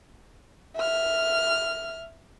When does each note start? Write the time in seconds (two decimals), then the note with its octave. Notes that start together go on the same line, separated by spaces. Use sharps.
0.76 E5 F6